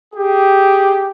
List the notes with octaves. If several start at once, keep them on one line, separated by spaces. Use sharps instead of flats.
G4 G#4